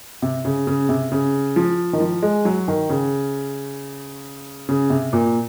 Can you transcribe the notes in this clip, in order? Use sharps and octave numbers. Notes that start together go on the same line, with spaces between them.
C3
C#3
C#3
C3
C#3
F3
D#3
F3
G#3
F#3
D#3
C#3
C#3
C3
A#2